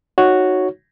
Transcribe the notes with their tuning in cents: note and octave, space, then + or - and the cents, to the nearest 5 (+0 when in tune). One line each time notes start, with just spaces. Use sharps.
D#4 +0 F#4 +0 C#5 +0